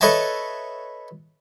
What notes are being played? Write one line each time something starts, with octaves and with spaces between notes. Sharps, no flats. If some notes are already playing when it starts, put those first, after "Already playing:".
A4 B4 C#5 D#5 E5 A5